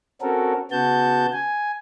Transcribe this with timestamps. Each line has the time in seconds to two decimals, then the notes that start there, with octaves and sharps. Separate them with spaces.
0.22 C4 C#4 F#4 A4 A#4
0.71 C#3 B3 F#4 A5 G6
1.32 G#5